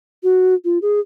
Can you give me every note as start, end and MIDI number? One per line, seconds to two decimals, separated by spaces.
0.23 0.54 66
0.65 0.78 65
0.82 1.00 68